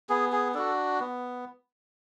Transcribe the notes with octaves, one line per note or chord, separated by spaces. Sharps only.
B3 G#4
G#4
D4 F#4 A4
B3